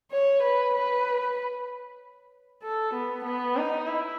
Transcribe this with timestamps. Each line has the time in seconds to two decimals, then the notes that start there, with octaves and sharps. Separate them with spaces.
0.12 C#5
0.43 B4
0.75 B4
2.63 A4
2.94 B3
3.25 B3
3.57 D#4
3.87 E4